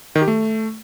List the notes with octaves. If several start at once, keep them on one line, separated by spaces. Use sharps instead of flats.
D#3
G4
A3